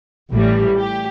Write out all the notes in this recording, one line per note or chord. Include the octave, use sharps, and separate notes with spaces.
A1 A2 E3 G3
G4